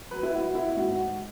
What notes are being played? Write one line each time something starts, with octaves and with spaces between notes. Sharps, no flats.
F#3 B4
E4
F#4
F#3
E4
G#2 F#4